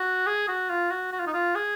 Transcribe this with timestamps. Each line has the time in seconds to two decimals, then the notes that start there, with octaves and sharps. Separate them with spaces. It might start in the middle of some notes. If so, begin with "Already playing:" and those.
Already playing: F#4
0.27 G#4
0.48 F#4
0.70 F4
0.91 F#4
1.12 F#4
1.19 F4
1.27 D#4
1.34 F4
1.56 G#4